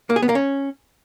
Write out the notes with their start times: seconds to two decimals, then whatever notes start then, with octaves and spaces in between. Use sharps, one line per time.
0.10 A#3
0.16 G#4
0.22 B3
0.29 A#3
0.35 C#4